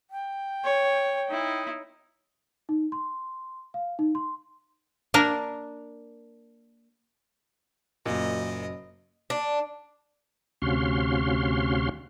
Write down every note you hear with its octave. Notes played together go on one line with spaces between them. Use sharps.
G5
C#5
D#4 E4
D#4
C6
F5
D#4
C6
A#3 D4 A#4
F#1 F#2 A#2 D#5
D4
D2 C3 C#4 F#4 F5 C6